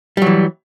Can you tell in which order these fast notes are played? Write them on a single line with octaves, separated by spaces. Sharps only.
G3 F#3 E3